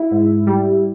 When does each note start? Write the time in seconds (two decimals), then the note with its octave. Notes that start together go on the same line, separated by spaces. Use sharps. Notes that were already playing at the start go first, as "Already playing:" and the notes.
Already playing: E4
0.11 G#2
0.47 G3